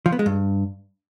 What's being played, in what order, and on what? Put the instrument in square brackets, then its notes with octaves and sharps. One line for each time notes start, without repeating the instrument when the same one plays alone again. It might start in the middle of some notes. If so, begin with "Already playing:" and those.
[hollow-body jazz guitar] F3
B3
G#3
G2